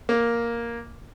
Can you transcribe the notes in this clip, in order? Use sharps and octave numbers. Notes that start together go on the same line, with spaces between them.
A#3